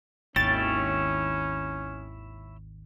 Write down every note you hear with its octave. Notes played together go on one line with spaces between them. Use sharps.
G#1 D#2 C#4 E4 C#5 G5 A6